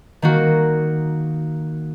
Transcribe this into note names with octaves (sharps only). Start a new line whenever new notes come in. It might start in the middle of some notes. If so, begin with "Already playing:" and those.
D#3 A#3 F#4